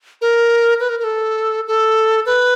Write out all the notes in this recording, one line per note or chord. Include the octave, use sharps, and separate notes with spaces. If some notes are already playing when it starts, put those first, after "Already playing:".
A#4
B4
A#4
A#4
A4
A4
B4